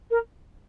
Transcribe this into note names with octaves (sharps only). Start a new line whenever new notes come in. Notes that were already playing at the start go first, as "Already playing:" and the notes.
A#4